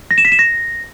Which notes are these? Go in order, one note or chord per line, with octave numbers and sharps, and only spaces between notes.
A#6
E7
B6
E7
A#6